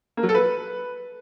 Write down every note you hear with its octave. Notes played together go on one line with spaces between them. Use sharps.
A#3
F#3
A4
B4